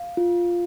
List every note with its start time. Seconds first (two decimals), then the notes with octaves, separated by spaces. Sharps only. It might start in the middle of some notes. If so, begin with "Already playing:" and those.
Already playing: F5
0.17 F4